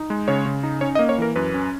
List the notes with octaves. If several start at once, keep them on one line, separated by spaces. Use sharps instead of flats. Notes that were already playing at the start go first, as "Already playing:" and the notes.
Already playing: D#4
G#3
C#3 C#5
C#3
D#4
C#4 C#5
D#5
A#3
C#5
E3 A#4
F#2 B4
C#4